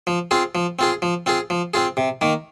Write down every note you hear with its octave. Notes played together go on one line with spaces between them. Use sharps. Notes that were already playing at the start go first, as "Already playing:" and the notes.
F3
C4 F4 G#4
F3
C4 F4 G#4
F3
C4 F4 G#4
F3
C4 F4 G#4
C3
D#3 A#3